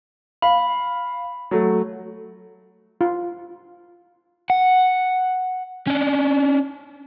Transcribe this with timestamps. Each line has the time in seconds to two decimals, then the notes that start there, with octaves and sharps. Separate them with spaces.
0.42 F5 B5
1.51 F#3 A3
3.01 F4
4.50 F#5
5.87 C#4 D4